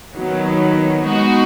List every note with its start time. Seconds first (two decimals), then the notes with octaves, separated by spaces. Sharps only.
0.14 D#3 F#3 B3
1.06 G#3 B3 D#4 F#4